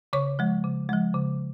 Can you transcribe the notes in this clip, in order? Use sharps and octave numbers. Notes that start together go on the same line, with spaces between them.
C#3 C#5 C#6
F3 G#3
C#3
F3 G#3
C#3